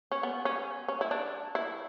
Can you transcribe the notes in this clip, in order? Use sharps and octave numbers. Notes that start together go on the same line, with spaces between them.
C#4
B3
C#4
C#4
E4
D4
E4